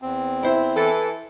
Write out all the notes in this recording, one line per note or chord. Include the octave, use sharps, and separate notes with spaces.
E2 C4
E4 C5
E3 A4